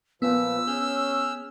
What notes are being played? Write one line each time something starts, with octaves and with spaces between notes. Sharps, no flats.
A#2 F3 B3 B4 E6
C#4 G#4 F6 G6